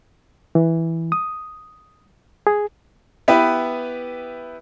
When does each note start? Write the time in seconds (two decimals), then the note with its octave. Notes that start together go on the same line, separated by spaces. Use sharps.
0.55 E3
1.12 D#6
2.47 G#4
3.28 B3 E4 G4 B4